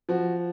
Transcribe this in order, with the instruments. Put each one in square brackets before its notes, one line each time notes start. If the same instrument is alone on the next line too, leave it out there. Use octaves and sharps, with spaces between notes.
[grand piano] F3 F#4